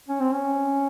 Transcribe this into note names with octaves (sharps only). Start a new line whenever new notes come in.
C#4
C4
C#4